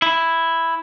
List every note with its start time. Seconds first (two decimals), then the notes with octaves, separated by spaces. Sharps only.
0.02 E4